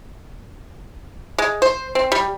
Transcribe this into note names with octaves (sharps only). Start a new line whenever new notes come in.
G#3
C5
C4
G3